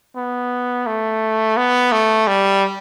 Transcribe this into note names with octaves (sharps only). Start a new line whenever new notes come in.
B3
A3
B3
A3
G3